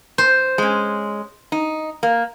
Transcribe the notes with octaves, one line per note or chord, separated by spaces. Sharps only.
C5
G#3 C#4
D#4
A#3